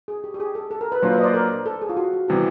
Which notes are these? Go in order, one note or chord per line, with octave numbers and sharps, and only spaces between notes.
G#4
G4
G4
G#4
A4
A4
A#4
B4
A#2 F#3 A#3 D4 F4 C5
B4
D#5
C5 D5
A#4
A4
G#4
F4
F#4
F#4
C3 E3 G3 B3 F#4